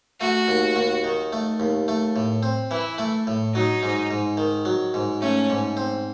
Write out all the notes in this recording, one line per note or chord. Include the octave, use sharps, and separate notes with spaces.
A3 F#4
D#2
D#2
D#3
A3
D#2
A3
A2
C4
E3 E4
A3
A2
F#3 D#4
G#2
G#2
D#3
F#3
G#2
A3 C#4
G#2
C4